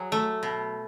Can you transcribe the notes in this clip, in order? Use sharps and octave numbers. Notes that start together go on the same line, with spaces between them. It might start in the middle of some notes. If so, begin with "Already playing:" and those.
Already playing: F#3 G#4
A3
B2